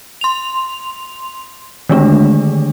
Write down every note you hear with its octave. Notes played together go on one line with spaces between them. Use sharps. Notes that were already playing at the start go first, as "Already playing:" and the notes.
C6 F7
D3 D#3 G#3 A3 D4